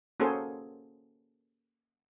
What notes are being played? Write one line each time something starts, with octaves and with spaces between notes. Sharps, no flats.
A#3 C#4 F#4 G#4 A4 C5